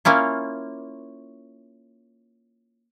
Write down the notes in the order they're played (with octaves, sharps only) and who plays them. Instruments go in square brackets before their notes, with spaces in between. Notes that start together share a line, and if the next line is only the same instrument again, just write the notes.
[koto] A#3 C#4 E4 F4